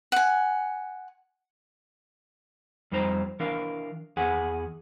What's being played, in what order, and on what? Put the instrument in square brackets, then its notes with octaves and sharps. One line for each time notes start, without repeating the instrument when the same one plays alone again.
[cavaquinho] F#5 G#5
[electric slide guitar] F2 G3 D#4 C5 A#5
E3 D4 A#4 F5
E2 G#4 F#5 G#5